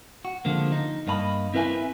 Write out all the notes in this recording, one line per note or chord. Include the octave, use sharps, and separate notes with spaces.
F#4
D3 F3 G#3 A#3
D#4
G2 A#3 D#5 A#5 B5
C4 E4 A#4 B4 E5 G#5